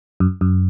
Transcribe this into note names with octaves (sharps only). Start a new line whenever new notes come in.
F#2
F#2